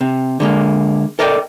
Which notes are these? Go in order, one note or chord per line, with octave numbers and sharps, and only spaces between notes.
C3
D3 G#3 A#3
A4 A#4 D5 D#5 F#5 G5